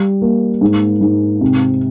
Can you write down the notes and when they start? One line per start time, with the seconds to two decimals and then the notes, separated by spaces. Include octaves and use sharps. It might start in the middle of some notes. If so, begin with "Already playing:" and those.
Already playing: G3
0.22 A#3
0.61 G#2
1.01 G#2
1.41 C3